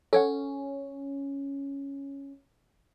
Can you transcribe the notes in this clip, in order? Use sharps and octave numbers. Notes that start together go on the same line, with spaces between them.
C#4 A4 C#5 F#5